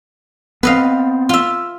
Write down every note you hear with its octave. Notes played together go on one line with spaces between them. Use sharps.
B3 C4 B4 D#5 F5
F4 E5